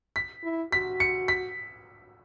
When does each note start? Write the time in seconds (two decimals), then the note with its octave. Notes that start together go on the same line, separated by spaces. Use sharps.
0.16 B6
0.43 E4
0.72 F#4 B6
1.00 C#7
1.28 B6